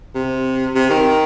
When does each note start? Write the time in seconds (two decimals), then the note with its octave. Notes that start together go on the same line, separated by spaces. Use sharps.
0.15 C3
0.75 C3
0.90 D#3